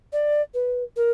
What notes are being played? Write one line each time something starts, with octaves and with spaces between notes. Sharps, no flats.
D5
B4
A#4